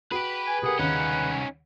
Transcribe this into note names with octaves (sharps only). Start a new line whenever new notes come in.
F#4 G#4 B4 G5
G#5
C2 G4 G#4 A#4 F#5
D#2 C#3 C#4 D#4 B4